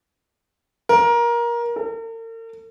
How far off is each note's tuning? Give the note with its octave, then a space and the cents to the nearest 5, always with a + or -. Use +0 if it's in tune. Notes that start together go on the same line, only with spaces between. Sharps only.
A#4 +20
A#4 -45